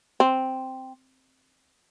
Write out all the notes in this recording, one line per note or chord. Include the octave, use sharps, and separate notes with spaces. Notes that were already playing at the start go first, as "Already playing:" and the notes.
C4